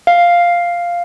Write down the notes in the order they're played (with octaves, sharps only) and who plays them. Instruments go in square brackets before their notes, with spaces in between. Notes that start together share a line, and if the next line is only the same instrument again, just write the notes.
[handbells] F5